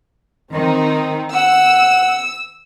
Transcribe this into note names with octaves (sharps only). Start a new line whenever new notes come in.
D#3 C4 D#4
F#5 E6